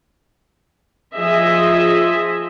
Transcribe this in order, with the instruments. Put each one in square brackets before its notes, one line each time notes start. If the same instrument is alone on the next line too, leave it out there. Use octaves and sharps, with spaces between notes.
[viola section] F3 G#4 D#5 E5